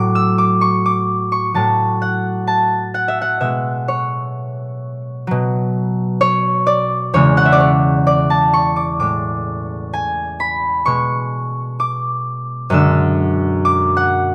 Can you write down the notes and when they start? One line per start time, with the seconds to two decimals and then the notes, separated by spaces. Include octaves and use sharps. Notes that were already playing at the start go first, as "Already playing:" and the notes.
Already playing: A2 F#3 D6
0.15 E6
0.38 D6
0.61 C#6
0.86 D6
1.32 C#6
1.54 A2 F#3 A5
2.02 F#5
2.47 A5
2.94 F#5
3.08 E5
3.21 F#5
3.40 B2 G#3 E5
3.88 C#5
5.27 B2 F#3
6.21 C#5
6.67 D5
7.14 E2 C#3 G#3 C#5
7.37 F#5
7.45 E5
7.52 D5
7.60 C#5
8.07 D5
8.30 A5
8.53 C#6
8.76 D6
8.99 A2 G#3 D6
9.93 G#5
10.40 B5
10.86 B2 G#3 C#6
11.80 D6
12.70 F#2 D3 G#3 E6
13.65 D6
13.97 F#5